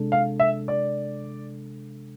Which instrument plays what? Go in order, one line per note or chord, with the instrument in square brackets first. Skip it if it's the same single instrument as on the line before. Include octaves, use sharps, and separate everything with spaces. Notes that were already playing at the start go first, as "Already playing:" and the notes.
Already playing: [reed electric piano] C3 G#3 D4 A4
[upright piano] F5
E5
D5